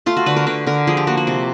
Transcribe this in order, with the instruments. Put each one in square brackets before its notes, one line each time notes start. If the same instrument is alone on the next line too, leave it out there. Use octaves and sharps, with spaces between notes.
[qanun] A3 F4
F#4
D3 B4
A#4
D3 B4
D3 A#4
F3 G#4
G4
A#3 F#4
F#4
C3